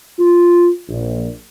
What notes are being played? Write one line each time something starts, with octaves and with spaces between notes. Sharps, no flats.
F4
A#1